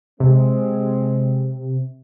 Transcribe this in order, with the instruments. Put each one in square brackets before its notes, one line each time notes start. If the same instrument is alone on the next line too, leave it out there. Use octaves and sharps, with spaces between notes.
[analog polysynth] C3 [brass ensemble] G#3 C4